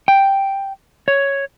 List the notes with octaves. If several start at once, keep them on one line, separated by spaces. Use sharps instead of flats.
G5
C#5